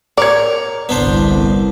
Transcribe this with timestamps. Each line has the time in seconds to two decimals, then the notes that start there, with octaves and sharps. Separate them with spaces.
0.18 A#4 C#5 D5
0.89 G1 C2 B3 D4 C5